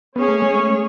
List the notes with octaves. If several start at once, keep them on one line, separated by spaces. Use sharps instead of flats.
B3 C#4 G#4 C#5
A3
G#3
A3